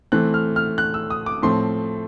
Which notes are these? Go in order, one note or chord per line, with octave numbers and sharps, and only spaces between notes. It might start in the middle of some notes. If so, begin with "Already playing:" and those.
E3 A3 C4 F#6
F6
F6
F#6
E6
D#6
D6
A2 F3 A3 C4 C6